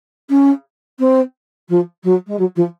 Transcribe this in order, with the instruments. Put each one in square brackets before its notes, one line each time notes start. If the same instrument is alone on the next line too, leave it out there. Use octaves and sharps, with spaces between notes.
[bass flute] C#4
C4
F3
F#3
G#3
F#3
F3